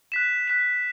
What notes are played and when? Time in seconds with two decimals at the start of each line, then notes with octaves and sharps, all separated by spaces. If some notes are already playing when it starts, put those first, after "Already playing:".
0.12 F#6 B6 E7
0.48 F#6 B6 E7